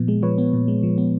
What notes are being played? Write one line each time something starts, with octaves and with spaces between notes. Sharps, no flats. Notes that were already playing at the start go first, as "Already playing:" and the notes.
Already playing: A#2 F3 B3
G#3
F3 B4 C#5
B3
A#2
G#3
F3
B3